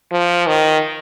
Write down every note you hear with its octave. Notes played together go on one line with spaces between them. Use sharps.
F3
D#3